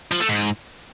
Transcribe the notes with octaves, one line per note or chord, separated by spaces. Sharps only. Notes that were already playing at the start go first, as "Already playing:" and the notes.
F3
A3
G#2